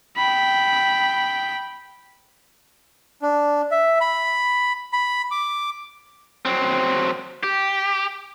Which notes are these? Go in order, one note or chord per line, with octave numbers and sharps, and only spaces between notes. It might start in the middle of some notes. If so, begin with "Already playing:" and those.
G5 B5
D4
E5
B5
B5
D6
F#3 C4
G4